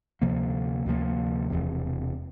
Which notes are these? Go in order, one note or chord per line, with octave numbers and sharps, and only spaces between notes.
D2 C3 F3 A#3
D2 C3 F3 A#3
E1 E2 C3